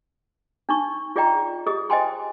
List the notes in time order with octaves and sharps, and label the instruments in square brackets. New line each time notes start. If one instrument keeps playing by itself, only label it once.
[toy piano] D4 D#4 C#6
F4 G#4 D5 D#5 G5 A#5
G4 G#4 D#5 D#6
C5 D#5 G5 G#5 C6